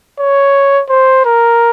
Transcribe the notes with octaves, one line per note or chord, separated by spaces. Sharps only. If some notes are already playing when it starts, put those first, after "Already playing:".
C#5
C5
A#4